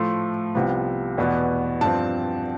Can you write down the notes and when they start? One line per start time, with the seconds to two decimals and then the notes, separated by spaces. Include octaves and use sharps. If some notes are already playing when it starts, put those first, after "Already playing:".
Already playing: A2 F3 A3 C6
0.55 C2 C3 F3 B3
1.18 E2 B2 B3
1.81 G2 F3 C4 A5